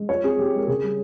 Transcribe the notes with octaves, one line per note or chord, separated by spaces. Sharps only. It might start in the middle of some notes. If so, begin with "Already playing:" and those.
Already playing: G#3
F3 C#5
C4 G#4
F3 G4
G#3 A#4
C#3 G#4
G3